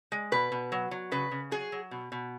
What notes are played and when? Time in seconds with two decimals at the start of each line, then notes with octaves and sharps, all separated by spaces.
0.12 G#3
0.32 B2 B4
0.52 B2
0.72 F#3
0.91 F#3
1.12 C#3 B4
1.31 C#3
1.51 F#3 G#4
1.72 F#3
1.91 B2
2.12 B2